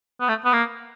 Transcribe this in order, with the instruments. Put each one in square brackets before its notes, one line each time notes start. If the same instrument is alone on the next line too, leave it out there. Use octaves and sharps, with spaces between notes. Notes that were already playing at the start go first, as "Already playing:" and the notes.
[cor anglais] B3
A3
B3
A#3